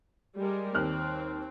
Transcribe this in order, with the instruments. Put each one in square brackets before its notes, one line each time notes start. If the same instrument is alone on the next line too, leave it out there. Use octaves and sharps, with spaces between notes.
[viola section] G3 G#3 A#4
[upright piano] D#2 F6 F#6 [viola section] C4